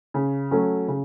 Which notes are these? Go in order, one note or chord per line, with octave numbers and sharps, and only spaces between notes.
C#3
F#3 A3 C#4 F#4
C#3